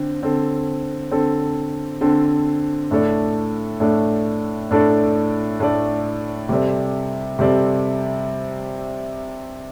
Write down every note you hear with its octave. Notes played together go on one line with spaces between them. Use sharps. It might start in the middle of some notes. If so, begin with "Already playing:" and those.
Already playing: D3 C4
D3 C4 A4
D3 C4 A4
D3 C4 A4
A2 A3 D4 A4 D5
A2 A3 D4 A4 D5
A2 A3 D4 A4 D5
A2 A3 D4 A4 D5
C3 G3 C4 A4 D5
C3 G3 C4 A4 D5